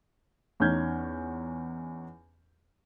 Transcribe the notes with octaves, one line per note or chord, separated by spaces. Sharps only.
E2 C#4 D#4 F6 G6 G#6